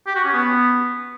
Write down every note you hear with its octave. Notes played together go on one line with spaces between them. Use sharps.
G4
F#4
C#4
B3